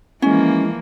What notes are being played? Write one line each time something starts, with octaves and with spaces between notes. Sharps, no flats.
E3 F3 G#3 A#3 C#4 E4